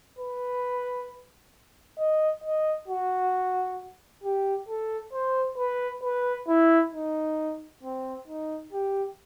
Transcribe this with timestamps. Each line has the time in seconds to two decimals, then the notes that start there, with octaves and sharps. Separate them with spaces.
0.18 B4
1.99 D#5
2.44 D#5
2.88 F#4
4.23 G4
4.68 A4
5.13 C5
5.58 B4
6.03 B4
6.48 E4
6.93 D#4
7.83 C4
8.28 D#4
8.72 G4